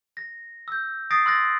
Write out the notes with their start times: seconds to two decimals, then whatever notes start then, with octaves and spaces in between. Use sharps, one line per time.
0.17 A#6
0.68 E6 G6
1.11 D#6 A6 A#6 C7 D7
1.26 C6 E6 F#6 A6 A#6